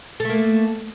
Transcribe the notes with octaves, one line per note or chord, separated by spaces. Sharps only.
A3 A#3 A4